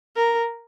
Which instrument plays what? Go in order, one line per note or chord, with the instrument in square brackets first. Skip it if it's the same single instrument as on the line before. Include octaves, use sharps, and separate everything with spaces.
[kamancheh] A#4